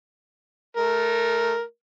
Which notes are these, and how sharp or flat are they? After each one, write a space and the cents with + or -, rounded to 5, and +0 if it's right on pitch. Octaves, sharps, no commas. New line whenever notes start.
A3 -20 A#4 +0